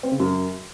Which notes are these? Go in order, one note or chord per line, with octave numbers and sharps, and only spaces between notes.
C4
C#3
F#2